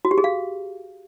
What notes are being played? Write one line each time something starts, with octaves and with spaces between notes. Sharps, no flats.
F#4
G4
G#4
F5